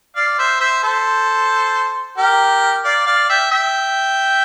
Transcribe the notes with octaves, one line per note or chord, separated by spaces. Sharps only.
D5 F5
C5 E5
C5 E5
A4 C5
G4 A#4
D5 F5
D5 F5
E5 G5
E5 G5